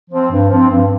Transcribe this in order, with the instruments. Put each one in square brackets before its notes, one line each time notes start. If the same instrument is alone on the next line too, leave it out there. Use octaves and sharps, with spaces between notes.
[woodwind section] F3 C4
G2
F3 C4
G2